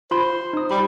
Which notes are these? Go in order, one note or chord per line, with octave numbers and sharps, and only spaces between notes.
F4 C5 B5 C6
D#4 D#6
G3 B5